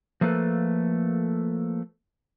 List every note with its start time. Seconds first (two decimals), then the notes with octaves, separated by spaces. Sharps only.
0.21 F3 A3 A#3 A4 B4